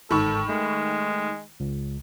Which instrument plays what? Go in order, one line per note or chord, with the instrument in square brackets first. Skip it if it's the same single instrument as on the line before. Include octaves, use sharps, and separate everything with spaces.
[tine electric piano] G1 G#2 E6 [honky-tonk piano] D#3 B5 C#6 [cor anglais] A4
[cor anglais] G#3 [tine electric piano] A3
[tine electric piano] C#2